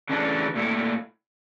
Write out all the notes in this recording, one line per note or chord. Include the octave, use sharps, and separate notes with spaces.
C#3 E3 A3 D4
A#2 A3 E4